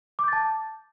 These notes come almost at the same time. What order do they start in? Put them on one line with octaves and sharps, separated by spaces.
D6 G6 A6 A5